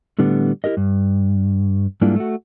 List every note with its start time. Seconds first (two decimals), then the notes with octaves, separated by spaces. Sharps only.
0.19 A2 D3 G3 B3
0.64 E4 F4 G4 A#4 D#5
0.77 G2
2.01 G#2 G3 A#3 D4 E4 F4
2.16 A3 F#4